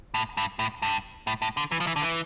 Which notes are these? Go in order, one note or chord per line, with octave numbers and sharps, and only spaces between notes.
A2
G2
A2
G2
A2
A2
D3
E3
F3
E3
D3
E3